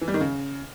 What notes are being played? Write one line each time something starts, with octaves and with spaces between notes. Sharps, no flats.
E3
G3
D#3
C#3